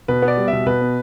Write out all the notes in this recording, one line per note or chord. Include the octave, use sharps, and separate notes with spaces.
B2 B4
B3
D5
G3
E5
B2
B2 B4
B3